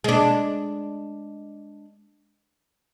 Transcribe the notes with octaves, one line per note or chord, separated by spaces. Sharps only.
G#3 D4